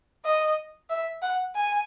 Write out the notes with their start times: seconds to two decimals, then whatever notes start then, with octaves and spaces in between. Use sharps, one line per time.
0.25 D#5
0.90 E5
1.22 F#5
1.55 G#5